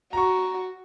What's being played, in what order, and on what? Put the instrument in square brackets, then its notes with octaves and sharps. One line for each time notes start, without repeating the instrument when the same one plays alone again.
[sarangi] F#4 [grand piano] A#5 C#6